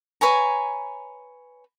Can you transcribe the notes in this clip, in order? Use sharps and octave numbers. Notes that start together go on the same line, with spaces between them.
B4 C#5 G#5 A#5